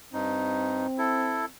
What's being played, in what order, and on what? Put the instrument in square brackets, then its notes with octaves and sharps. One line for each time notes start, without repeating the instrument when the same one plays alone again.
[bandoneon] G2 D#4 [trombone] C4
[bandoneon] E4 A4